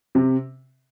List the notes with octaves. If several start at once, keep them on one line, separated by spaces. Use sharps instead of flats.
C3